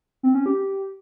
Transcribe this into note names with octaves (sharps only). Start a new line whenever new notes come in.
C4
C#4
G4